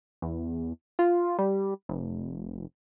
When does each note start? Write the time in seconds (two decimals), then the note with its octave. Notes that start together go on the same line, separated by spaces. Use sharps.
0.22 E2
0.99 F4
1.38 G3
1.89 F1